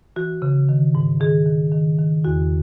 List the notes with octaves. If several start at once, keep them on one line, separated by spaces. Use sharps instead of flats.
E3 F#4
C#3
D#3
G#2
D#3 G#4
D#3
D#3
D#3
E2 F#4